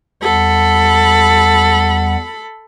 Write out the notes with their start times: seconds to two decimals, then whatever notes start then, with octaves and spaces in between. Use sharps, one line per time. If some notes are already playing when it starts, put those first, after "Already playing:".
0.23 E2 G3 A4 F#5 B5